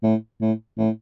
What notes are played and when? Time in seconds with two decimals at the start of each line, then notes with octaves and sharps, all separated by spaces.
0.03 A2
0.41 A2
0.78 A2